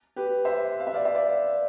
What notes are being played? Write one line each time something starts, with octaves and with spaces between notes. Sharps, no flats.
G4 B4
C5 E5
F5
E5
D5 F5
E5
D5 F5